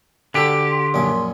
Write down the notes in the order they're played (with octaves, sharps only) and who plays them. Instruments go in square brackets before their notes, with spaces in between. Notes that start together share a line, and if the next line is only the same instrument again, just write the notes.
[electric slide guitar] D3 G4 [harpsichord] F#4 A4
[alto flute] C6
[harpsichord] A#1 F#2 G#4